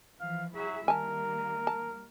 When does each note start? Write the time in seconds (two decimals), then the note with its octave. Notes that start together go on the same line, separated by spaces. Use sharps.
0.20 E3 F3 F5
0.56 F#3 E4 G#4 E5
0.88 D#3 G3 A#3 A#4 G#5 A5
1.67 A5